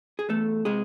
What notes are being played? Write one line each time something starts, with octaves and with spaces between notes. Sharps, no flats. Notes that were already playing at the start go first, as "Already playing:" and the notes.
G#4
E2 A3 A4
C3 G#3 G#4